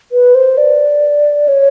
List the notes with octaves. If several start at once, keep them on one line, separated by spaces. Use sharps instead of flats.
B4
C5
D5
C#5